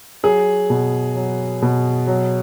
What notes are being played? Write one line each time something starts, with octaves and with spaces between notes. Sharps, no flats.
F#3 G#4
B2
F#3
B2
F#3